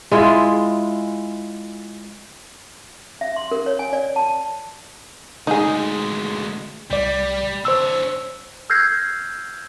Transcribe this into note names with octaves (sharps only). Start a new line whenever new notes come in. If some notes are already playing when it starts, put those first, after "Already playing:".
G#3 E4 F4
E5
C6
A#4
C#5
G#5
D5
A5
D2 G#3 D#4 G#4
C2 G3 D5
D4 C5 C#5 E6
E6 F6 G6 G#6 A#6 C7